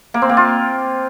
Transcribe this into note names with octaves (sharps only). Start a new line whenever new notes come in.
A#3
C4
A#3
F4